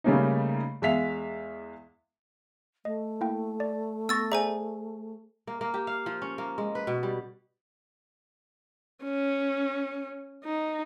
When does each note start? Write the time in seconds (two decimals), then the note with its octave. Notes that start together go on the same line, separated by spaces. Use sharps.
0.04 C#3 G3 A3 A#3 C#4 D#4
0.82 E2 G#3 E5 F5 B6 F7
2.85 A3 D#5
3.21 A#3 E4 G5
3.60 D5
4.09 B3 C#6 E6 A6 A#6
4.32 G#4 C5 D5 E5 G#5 A#5
5.47 A#3
5.61 A#3
5.74 G4
5.87 F5
6.06 F3
6.22 C#4
6.38 A#3
6.58 G#3
6.75 B4
6.87 B2
7.03 G3
9.03 C#4
10.44 D#4